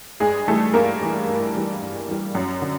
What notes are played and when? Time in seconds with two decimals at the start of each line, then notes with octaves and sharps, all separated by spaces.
0.20 G2 G#3 G#4
0.47 E3 G3 A3 A4
0.74 G2 A#3 A#4
1.02 E3 G3
1.29 G2
1.55 E3 G3
1.82 G2
2.08 E3 G3
2.35 F#2
2.62 D3